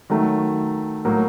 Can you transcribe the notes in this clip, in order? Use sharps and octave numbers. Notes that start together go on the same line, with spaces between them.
D#3 F#3 A3
A2 F#3 A#3